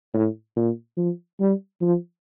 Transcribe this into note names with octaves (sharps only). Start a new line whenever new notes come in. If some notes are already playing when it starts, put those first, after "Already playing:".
A2
A#2
F3
G3
F3